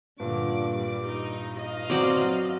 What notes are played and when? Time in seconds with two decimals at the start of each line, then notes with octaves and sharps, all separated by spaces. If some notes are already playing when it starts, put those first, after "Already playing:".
0.20 G2 A#2 D3 D6
0.73 G3 D6
1.06 D#4
1.60 D#5 F5
1.90 F#3 C4 D5